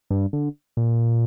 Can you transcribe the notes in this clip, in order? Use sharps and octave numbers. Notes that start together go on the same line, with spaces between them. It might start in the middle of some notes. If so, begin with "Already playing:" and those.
G2
D3
A#2